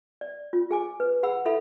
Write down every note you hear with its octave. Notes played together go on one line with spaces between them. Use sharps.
D5
F4
G#4 G#5 D6
B4
G#4 F#5 B5 E6
E4 A4 E5 B5